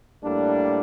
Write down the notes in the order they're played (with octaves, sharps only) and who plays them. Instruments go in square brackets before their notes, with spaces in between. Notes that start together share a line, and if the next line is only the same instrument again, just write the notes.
[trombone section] A2 G3 A#3 D4